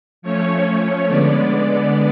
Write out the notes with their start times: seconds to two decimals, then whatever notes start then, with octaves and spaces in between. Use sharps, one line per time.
0.22 F3 A3 C#4 C#5
1.08 D3 G#3 B3 D5